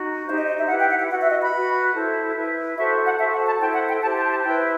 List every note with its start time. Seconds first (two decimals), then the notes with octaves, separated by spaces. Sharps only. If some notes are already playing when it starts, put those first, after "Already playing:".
Already playing: D#4 F#4
0.27 D#4 G4 C5 E5
0.36 D#5
0.47 D#5
0.58 E5
0.68 E4 G4 B4 F#5
0.79 G5
0.89 F#5
0.99 F#5
1.10 F#4 B4 F#5
1.21 E5
1.31 D#5
1.41 B5
1.52 F#4 B4
1.94 E4 A4 C5
2.35 E4 B4 E5
2.77 F#4 A4 C5 E5
3.05 F#5
3.18 F#4 A4 C5 E5
3.32 F#5
3.46 A5
3.60 E4 A4 C5 G5
3.74 F#5
3.88 G5
4.02 E4 G4 C5 A5
4.16 A5
4.30 A5
4.44 E4 B4 G5